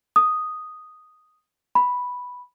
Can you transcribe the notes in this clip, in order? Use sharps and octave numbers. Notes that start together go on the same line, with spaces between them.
D#6
B5